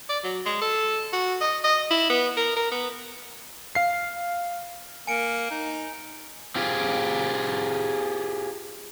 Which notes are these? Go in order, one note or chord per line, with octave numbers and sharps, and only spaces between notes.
D5
F#3
G#3
A4
F#4
D#5
D#5
E4
B3
A#4
A#4
B3
F5 C7
A#3 G#5 C#7 D7
D#4
C4 F4 G4 G#4